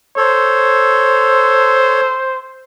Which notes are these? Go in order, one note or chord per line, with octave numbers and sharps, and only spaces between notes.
A4 C5 C#5